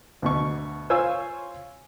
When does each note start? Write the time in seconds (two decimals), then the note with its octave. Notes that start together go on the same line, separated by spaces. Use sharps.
0.22 D2 B2 C#6
0.90 F4 C5 C#5 G#5 E6